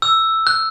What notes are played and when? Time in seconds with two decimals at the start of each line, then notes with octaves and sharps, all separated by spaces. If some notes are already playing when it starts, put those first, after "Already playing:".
0.02 E6
0.47 F#6